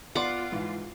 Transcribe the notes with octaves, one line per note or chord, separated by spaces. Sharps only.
B3 F4 D5 F#5 C6 D6
G#2 E3